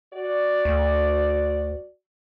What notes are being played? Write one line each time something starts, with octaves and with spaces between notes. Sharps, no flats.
F#4 D5
D2